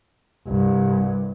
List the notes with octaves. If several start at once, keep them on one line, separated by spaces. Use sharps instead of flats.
C2 G2